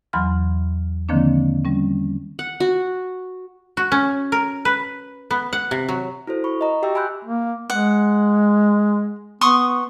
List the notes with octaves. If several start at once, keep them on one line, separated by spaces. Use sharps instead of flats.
E2 E3 F#3 B5 C6 F6
D3 D#3 F3 A#3 C4 D4
G3 C#4
F#5
F#4
F#4
C#4
A#4
B4
B3
F#5
C3
F#3
E4 F#4 A4 C5
B5 C#6
D#5 A#5
F#4 G4 E5 G5 D6 E6
G#5 B5 C6 E6 F#6 G6
A#3
G#3 F#5
B3 C6 C#6 D#6